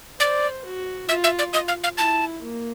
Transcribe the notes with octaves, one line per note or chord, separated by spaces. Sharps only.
C5 D5
F#4
F4 E5
E5
D5
D#5
F5
F5
E4 A5
A#3